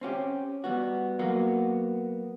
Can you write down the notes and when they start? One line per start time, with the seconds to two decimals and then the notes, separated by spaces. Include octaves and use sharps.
0.01 C4 C#4 F#4 G4
0.64 G3 B3 F#4
1.19 F#3 A#3 B3 F#4